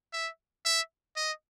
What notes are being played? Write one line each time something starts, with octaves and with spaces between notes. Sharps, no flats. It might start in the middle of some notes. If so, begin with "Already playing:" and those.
E5
E5
D#5